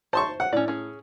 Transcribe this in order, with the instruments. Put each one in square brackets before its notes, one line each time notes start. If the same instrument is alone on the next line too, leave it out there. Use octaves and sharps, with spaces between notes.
[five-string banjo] C5 [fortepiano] A5 C6 C#6
[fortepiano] F#5
[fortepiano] A2 [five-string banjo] C#4 D5
[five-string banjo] C#4 G#4